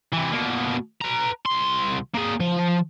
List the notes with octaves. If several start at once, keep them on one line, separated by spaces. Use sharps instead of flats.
C3 E3
B2 A#3
B4 A#5
C2 C6
A#3 G#4
F3